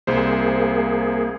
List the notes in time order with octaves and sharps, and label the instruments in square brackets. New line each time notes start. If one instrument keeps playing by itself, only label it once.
[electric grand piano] C2 C5 [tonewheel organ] A#3 G#4